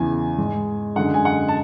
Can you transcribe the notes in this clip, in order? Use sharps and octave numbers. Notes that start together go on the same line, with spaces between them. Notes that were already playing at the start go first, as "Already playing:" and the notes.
Already playing: E2 C#3 E3 G#5
G#2 G#3
F#2 D3 G#3 F#5
G#5
F#5
A5